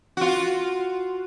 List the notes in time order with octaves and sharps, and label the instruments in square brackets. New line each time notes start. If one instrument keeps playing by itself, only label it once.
[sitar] F4 F#4